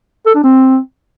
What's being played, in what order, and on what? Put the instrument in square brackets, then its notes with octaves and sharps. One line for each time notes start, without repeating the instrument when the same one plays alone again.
[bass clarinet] A4
D4
C4